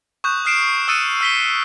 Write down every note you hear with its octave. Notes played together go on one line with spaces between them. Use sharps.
C#6 D#6 F#6 G6 E7
D#6 F6 C7 D7 E7
D#6 E6 F#6 A6 C#7 D#7
E6 B6 G7